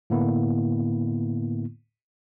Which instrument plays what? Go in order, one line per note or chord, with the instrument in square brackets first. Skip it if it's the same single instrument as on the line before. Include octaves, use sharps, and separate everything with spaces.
[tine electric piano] A2 D3 A#3 B3 E4